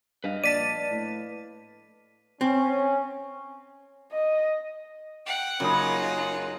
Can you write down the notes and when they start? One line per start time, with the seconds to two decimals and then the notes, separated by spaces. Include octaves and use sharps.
0.24 G2 B4 D#5 F5
0.44 A#1 D5 A5 B6 D#7
0.91 A2
2.41 C4 C#4
4.12 D#5
5.27 F#5 G5
5.60 F#2 C#3 A#3 D#4 F4 G#4